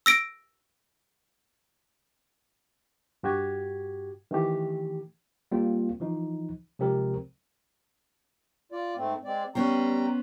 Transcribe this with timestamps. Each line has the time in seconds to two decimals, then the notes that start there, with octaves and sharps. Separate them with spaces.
0.06 E6 A#6 D7
3.23 G2 F#4 G4 G#6
4.31 D#3 E3 A3 G4
5.52 G3 A#3 C4 F4
6.00 E3 F3 D#4
6.79 C3 F3 G#3 C4 G4 A#4
8.72 F4 D5
8.97 G#2 A3 C4
9.25 G#3 C4 D5
9.55 G3 B3 C#4 C5 G5 A#5